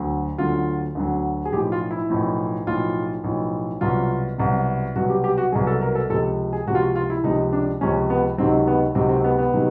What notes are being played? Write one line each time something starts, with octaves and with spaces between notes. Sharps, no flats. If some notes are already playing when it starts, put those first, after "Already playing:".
Already playing: D2 D3 F#3
D2 D3 F#3 F4
D2 D3 F#3
G#4
B1 A2 F3 G4
F4
E4
B1 A2 F3
B1 A2 F3 F4
B1 A2 F3
C2 B2 F#3 F4
C2 B2 F#3
C2 B2 F#3 F#4
G4
G4
F#4
C2 B2 F#3 G#4
A4
A#4
A4
C#2 C3 F3 A4
G#4
C#2 C3 F3 F#4
F4
F#4
F4
E4
C#2 C3 F3 D#4
D4
C#2 C3 F3 C#4
B3
C#2 C3 D#3 F#3 C4
B3
C#2 C3 D#3 F#3 C4
C4
B3
B3
C3 D#3 F#3